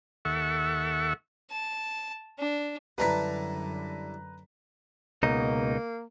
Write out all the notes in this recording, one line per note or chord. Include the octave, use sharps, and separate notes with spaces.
D#2 A4 E5 F#5 C#6
A5
D4
F#2 D3 G3 D4 E4 B4 A#5 B6
C#2 B2 A#3 D#4